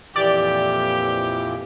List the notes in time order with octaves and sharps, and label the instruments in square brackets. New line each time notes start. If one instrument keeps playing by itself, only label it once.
[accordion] F2 A#2 E3 [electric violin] G4 [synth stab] D5